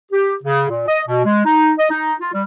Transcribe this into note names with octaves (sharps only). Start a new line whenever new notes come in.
G4
C#3
A#2
D#5
B2
G#3
D#4
D#5
D#4
F4
G3